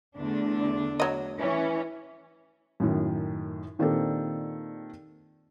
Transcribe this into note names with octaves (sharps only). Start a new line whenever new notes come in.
E2 D3 A3 D4
F#3 D#5
E3 C#4
F#2 A2 D#3
A#2 D#3 C4 D4 G4 A4